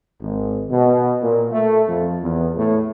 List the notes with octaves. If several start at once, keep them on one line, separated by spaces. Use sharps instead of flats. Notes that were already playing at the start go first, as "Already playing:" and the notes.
G#1
B2
A#2
A3
F2
E2
A2